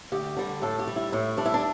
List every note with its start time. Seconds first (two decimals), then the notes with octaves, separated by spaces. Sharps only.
0.12 D2 G4
0.37 D3 G3
0.62 A2 A4
0.79 G4
0.87 G3
0.96 E4
1.12 A2 E4
1.37 G3 D4
1.46 E4
1.54 D4